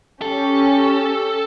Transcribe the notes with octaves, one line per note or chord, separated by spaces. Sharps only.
C#4 G4 A4